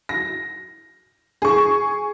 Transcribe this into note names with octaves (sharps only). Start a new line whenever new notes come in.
A#6
G#4 C#6